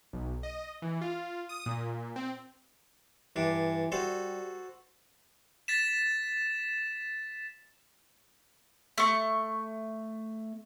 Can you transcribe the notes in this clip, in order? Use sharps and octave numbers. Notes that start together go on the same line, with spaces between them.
B1
D#5
E3
F4
D#6
A#2
C4
G2 E3 D4
G3 F#4 A4 C5
A6 B6 E7
A3 C#6